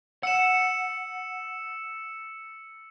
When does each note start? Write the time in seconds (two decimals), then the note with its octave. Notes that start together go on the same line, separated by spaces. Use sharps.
0.23 F#5 E6 C#7 E7